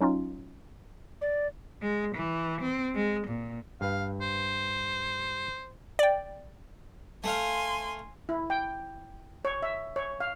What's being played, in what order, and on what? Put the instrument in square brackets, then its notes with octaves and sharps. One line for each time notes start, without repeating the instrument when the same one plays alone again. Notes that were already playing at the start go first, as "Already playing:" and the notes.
[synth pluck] F#3 C#4 D#4 F4
[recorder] D5
[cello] G#3
E3
C4
G#3
A#2
[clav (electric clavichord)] G2 B4 [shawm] F5
[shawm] C5
[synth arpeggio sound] D5 G5
[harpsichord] A3 F5 [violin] G#5 C6
[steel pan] E4
G5
C#5
E5
C#5
F5